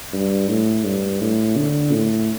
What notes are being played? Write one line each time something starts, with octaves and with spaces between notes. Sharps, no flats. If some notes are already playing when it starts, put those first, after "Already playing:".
G2
A2
G2
A2
D3
A2